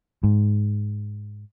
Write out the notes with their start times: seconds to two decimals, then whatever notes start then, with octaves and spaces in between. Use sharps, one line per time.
0.23 G#2